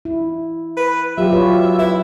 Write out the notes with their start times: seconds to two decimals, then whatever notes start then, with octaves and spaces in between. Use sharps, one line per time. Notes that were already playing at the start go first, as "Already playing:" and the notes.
0.05 E4
0.77 B4
1.18 F#3 F4 G4 E5
1.32 F4 B4 C#5
1.79 E4 B4